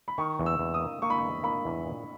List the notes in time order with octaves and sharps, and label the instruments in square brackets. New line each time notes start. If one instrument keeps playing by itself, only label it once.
[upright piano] B5
[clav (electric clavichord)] D#3 [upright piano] C#6
[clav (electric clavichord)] E2
[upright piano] E6
[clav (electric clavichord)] E2
[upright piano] D#6
[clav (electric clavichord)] A#3
[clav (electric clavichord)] A#3 [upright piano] C#6
[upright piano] B5
[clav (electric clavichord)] E2 [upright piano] C#6
[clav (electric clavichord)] A#3 [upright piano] B5
[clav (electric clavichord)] E2
A#2